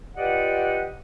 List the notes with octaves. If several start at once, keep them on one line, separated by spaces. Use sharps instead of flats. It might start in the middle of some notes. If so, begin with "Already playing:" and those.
F4 G4 B4 D5 D#5 F#5